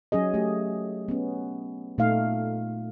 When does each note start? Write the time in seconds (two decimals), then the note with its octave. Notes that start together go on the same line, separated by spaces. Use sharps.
0.12 F#3 C#4 G#4 D#5
0.34 A3 G4
1.08 B3 C#4
1.98 A#2 A3 D#4 F5